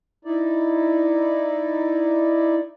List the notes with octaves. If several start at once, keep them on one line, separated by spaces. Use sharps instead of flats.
D#4 E4 D5